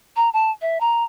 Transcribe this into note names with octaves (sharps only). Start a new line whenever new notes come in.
A#5
A5
E5
A#5